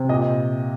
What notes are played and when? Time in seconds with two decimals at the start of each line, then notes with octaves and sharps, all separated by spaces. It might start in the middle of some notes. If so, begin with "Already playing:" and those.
Already playing: C3
0.09 A#2 D#5